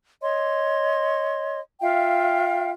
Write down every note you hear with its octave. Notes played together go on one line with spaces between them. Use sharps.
C#5 D#5 C6
F4 E5 F5 G5